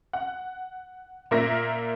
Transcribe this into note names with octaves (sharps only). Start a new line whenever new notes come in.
F#5
A#2 A#3 A#4 E5 A#6